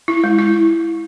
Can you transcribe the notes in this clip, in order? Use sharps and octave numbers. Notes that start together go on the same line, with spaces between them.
E4
G#3
E4